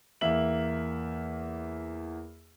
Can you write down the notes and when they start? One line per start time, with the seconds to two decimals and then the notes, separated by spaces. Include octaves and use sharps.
0.21 E2 A#3 E5 F#7